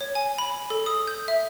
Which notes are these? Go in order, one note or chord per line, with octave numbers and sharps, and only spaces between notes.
C#5
G#5
B5
A4
D#6
G6
E5